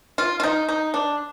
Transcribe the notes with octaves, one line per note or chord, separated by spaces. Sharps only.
F4
F4
D#4
D#4
D4